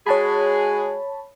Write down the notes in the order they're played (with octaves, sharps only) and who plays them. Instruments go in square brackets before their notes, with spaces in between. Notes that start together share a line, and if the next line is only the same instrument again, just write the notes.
[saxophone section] G#3 F#4 G#4 [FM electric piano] C#5 A5 B5